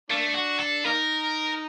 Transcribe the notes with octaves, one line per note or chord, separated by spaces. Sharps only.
A3 A#3 D4
F#4
A4
A#3 D#4 A#4